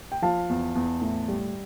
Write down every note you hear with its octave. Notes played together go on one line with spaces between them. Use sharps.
G5
F3 F5 A5
E2
E2
A2
G3